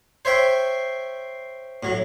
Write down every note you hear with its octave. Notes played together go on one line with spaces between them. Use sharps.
C5 C#5 E5 G5
A2 F#3